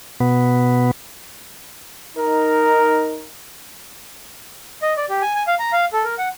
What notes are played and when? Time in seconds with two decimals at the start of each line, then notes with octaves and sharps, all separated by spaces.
0.20 B2 B3
2.17 D#4 A#4
4.82 D#5
4.97 D5
5.09 G4
5.22 G#5
5.35 G#5
5.47 F5
5.59 A#5
5.72 F5
5.93 A4
6.04 A#4
6.18 F#5